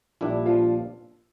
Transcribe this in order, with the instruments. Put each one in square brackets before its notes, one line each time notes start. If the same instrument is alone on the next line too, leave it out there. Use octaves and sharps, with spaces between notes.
[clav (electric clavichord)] A#1 A#2 G3 D4 [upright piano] E4
[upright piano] F3 F4